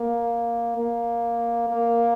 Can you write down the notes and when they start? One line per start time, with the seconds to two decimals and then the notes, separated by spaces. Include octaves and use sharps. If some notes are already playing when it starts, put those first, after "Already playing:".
Already playing: A#3
0.78 A#3
1.69 A#3